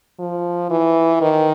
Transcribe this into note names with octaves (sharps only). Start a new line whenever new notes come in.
F3
E3
D#3